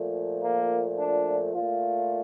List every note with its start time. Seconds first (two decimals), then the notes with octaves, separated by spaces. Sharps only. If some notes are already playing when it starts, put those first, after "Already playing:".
Already playing: A#2 F3 A3
0.43 A#3
0.98 D4
1.54 A#2 A3 F4